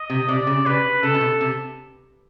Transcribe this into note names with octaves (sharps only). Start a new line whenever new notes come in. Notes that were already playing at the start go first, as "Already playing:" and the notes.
Already playing: D#5
C3
C3 D5
C#3
C#3 B4
C#3 A4
B2
C3
C3